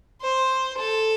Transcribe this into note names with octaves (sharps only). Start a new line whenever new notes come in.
C5
A4